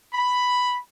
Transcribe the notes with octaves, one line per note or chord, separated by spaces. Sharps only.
B5